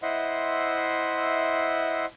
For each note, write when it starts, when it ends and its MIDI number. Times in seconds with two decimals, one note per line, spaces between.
0.02 2.05 64
0.02 2.05 72
0.02 2.05 75
0.02 2.05 76
0.02 2.05 78
0.02 2.05 84